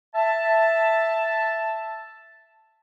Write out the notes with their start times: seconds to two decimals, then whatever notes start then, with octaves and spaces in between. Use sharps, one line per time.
0.15 E5 A5